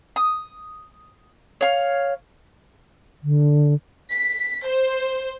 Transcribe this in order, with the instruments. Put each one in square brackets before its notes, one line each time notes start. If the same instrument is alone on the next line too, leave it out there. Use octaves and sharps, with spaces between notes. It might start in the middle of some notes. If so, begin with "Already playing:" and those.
[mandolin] D#6
C#5 F5
[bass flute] D3
[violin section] B6
C5